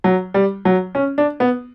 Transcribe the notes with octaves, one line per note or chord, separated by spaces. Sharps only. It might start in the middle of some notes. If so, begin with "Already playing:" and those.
F#3
G3
F#3
C#4
D4
B3